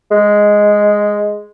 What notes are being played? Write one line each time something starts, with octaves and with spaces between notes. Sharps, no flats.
G#3